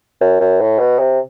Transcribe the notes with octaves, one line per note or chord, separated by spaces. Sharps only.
F#2
F#2
A2
B2
C3